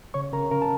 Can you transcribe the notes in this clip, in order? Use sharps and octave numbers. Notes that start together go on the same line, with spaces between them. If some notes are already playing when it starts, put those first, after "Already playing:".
C#3 C#5 C#6
C#3 A#4 A#5
C#3 A#4 A#5
A5